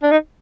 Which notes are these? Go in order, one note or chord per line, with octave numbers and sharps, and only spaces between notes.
D4
D#4